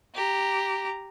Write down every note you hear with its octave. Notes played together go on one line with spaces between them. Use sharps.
G4 A#5